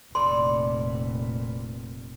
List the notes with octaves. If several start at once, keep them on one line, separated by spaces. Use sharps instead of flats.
F1 A#2 E3 A4 D5 C6